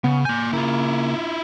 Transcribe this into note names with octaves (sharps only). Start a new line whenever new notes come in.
C#3 B3
A#3 G#5 G6
C#3 A#3 E4 F4